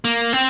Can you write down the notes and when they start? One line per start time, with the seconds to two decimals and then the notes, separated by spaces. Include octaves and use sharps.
0.05 A#3
0.33 C4